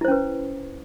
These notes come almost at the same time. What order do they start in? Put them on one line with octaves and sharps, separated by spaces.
E4 C5 C#4 B4